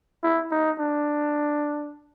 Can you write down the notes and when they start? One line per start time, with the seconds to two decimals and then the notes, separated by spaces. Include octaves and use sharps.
0.23 E4
0.51 D#4
0.79 D4